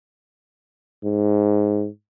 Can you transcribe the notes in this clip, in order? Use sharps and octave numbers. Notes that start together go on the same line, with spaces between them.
G#2